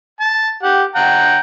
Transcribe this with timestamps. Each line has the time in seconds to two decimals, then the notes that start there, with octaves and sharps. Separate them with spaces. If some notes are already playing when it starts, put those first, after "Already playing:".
0.20 A5
0.63 G4 F#5
0.95 F#5 G5 A#5